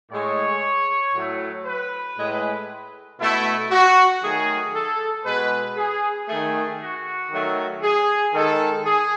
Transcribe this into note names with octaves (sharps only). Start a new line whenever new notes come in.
A2 G#3 C#5
A2 F#3 A3
B4
A2 G#3
B2 A3 E4
F#4
D#3 F#3 A3 G#4
A4
B2 G#3 B4
G#4
D#3 A3 G#4
F#4
D#3 F#3 A3
G#4
D#3 G#3 A4
G#4